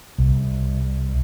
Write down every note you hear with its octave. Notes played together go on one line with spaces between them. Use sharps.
C2